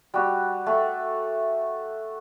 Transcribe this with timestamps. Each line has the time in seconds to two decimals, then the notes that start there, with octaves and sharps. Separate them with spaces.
0.14 G3 F#4
0.66 A3